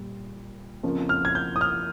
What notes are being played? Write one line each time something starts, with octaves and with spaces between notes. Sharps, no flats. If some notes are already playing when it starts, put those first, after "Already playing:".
Already playing: A#2 G3
F2 C#3 F3 A#3 C#4
F6
G#6
G6
D#6
F6